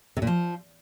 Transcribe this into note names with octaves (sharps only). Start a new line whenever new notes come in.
C3
A#2
F3